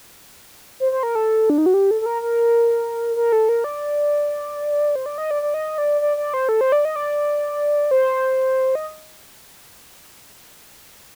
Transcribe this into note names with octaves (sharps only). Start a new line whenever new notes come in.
C5
C5
A#4
A4
D4
D#4
F#4
G4
A4
A4
A#4
A#4
A#4
A4
A#4
D5
C5
D5
D#5
D5
D5
D#5
D5
D5
D5
C5
A4
C5
D5
D#5
D5
C5
D#5